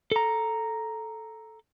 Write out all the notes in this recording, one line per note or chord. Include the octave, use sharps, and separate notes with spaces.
A4 A#5